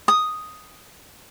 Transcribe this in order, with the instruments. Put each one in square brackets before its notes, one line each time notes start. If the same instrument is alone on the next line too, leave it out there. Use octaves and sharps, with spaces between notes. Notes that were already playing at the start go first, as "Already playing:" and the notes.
[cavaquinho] D#6